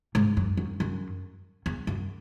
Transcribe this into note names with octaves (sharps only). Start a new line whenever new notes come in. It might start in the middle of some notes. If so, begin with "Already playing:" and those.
G#2
F#2
F#2
F#2
E2
F#2